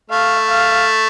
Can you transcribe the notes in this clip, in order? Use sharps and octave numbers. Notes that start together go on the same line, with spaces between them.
A3 F5
F5